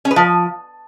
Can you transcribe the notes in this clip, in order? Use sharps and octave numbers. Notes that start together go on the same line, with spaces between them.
C#4
B4
F3